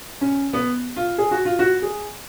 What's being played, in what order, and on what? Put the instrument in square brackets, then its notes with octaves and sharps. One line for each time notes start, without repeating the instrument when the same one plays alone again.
[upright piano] C#4
B3
F4
G#4
F#4
F4
F#4
G#4